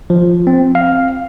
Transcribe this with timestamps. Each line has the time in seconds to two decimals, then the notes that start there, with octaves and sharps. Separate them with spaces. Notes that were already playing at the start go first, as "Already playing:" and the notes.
0.10 F3
0.47 C4
0.75 F5